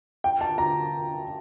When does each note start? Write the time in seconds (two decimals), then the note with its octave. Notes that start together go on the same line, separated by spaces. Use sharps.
0.24 G5
0.41 A5
0.58 A#5